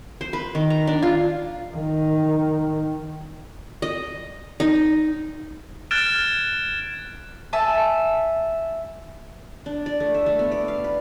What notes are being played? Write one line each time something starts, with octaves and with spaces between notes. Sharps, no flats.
C5
B4
D#3
A#5
D4
F4
D#3
D#5
D#4
F6 F#6 G#6 A6 D7 E7
E5 G#5 A5
D4
D5
A3
E5
A3
B3
D5
F5
B4